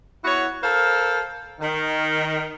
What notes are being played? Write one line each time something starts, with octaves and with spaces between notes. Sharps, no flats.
B3 E4 F#4 C#5
A4 A#4 C5 F5
D#3